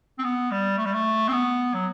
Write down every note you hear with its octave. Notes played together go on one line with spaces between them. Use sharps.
C4
B3
G3
A3
G3
A3
C4
B3
F#3